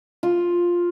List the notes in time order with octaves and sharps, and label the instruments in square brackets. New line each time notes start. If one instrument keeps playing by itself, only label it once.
[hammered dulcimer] F4